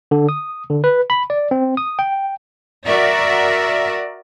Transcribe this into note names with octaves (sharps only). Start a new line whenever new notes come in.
D3
D#6
D3
B4
B5
D5
C4
D#6
G5
F#4 A#4 D5 E5